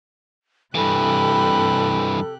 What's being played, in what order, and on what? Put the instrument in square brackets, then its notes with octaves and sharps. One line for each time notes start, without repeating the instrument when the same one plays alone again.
[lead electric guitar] G2 E3 [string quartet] C3 G4 F#6 [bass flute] A4 [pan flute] B5